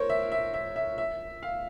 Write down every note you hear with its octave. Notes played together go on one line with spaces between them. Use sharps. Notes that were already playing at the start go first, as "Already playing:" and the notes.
Already playing: A#4 C5 C#5
E5
E5
E5
E5
E5
F5